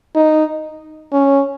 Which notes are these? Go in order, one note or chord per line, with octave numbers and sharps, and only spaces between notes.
D#4
C#4